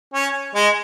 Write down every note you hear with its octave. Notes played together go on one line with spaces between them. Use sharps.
C#4
G#3